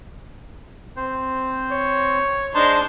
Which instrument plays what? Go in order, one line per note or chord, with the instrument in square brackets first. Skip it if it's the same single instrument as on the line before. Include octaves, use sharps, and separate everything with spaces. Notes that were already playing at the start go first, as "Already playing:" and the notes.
[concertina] C4 C5
[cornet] C#5
[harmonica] G#3 D#4 C6 [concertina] D4 C5 A5